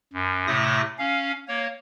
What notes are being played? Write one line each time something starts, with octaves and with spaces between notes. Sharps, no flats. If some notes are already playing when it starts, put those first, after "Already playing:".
F#2
A2 C3 A3 D#6 A#6
C#4 F5
A#3 C#5